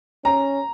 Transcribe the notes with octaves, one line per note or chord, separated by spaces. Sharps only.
C#4 A#5